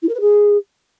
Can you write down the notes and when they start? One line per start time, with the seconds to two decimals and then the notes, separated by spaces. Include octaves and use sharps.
0.02 E4
0.08 A#4
0.14 B4
0.20 G#4